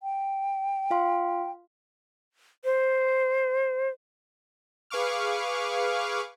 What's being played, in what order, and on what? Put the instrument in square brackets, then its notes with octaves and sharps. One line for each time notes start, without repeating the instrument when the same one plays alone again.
[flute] G5
[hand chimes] F4 F5 C6
[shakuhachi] C5
[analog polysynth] G#4 B4 F5 C#6 D6 F6